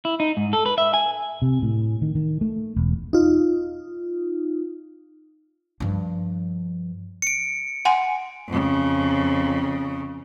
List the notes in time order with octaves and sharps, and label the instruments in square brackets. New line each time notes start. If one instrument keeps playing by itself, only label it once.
[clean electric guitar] E4
D#4
G#2
A4
B4
E5
G#5
[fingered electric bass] C3
A2
D#3
D#3
A3
E1
[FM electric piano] D#4 F4
[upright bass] G2 F3
[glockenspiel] C#7 D7
[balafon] F#5 G#5 C6
[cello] F2 C#3